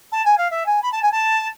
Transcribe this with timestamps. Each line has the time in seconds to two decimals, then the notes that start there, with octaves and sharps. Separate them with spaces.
0.12 A5
0.25 G#5
0.37 F5
0.50 E5
0.66 G#5
0.82 B5
0.92 A5
1.02 G#5
1.11 A5